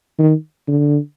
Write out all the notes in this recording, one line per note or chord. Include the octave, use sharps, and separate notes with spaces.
D#3
D3